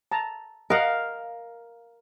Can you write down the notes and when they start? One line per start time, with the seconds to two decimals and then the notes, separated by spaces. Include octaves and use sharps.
0.12 A5 A#5
0.70 A#4 D#5 F5 F#5